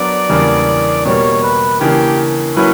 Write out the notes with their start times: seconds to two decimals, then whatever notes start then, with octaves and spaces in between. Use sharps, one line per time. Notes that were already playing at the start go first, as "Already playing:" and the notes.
Already playing: F#3 B3 D4 A#4 D5
0.29 E2 C#3 G3 A#3 D4
1.06 B2 G3 A#3 C#5
1.43 B4
1.80 C#3 E3 A#3 D4 G4
2.56 F#3 A#3 C#4 E4 B4